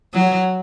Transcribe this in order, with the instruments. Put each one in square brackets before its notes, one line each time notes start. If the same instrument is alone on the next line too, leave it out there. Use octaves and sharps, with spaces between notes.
[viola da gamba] F#3